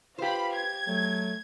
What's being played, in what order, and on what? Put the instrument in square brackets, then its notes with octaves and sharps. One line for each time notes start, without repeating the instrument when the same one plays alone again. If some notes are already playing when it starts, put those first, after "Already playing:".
[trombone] F4 [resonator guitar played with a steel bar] G4 C5 [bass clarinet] B4 [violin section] F5 B5
[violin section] G#6
[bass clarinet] F#3 [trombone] A3